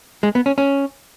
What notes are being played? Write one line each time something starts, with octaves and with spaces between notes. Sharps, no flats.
G#3
B3
C#4
C#4